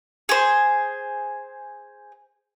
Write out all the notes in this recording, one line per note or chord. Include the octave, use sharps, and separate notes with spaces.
G#4 C5